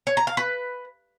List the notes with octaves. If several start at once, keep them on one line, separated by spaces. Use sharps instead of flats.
C#5
A#5
F5
B4